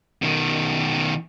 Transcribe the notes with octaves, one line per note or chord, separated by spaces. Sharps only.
B2 D#3